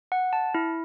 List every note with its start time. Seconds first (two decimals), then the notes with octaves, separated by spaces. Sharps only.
0.12 F#5
0.33 A5
0.55 E4